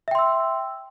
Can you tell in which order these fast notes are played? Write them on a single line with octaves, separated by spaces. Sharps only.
E5 G5 C6 E6